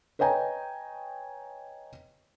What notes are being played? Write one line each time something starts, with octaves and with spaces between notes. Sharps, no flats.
B4 C#5 D#5 G5 G#5 A#5